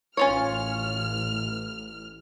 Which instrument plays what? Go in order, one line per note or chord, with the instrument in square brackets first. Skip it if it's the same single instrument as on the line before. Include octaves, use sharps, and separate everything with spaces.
[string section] A1 F6 [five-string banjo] C#4 F4 C#5